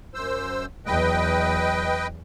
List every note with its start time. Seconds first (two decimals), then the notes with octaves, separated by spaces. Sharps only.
0.14 F#2 C5 E6
0.86 E2 F#3 B4 D#5 G5